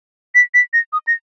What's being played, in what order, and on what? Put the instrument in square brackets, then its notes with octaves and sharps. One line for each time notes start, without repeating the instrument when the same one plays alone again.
[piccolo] B6
B6
A#6
D#6
A#6